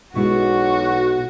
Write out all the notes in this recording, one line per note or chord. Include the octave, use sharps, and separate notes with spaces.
B1 B2 G#3 E4 F#4 C#6